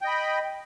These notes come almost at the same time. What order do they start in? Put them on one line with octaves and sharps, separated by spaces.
G5 D#5 B5